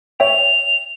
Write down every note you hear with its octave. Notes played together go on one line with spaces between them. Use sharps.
C#5 E5 G5 F7